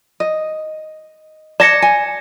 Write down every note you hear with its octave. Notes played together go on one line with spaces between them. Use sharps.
D#5
D5 A5 A#6 C#7
G#5